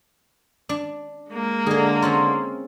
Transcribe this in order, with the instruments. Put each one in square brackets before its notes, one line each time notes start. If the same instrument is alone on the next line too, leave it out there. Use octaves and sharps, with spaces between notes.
[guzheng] D4
[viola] G#3 A#3
[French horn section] D3 [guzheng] G#4 D#5
[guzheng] C4 C#4 F4